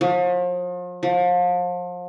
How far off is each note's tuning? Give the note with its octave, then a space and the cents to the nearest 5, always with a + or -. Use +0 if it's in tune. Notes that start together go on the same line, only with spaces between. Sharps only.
F3 +40
F3 +35